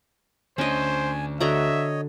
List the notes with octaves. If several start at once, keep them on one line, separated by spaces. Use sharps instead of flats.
D2 C#4 D4 C5 D#5 G#5
D3 F#4 C#5 D#5 E5 A#5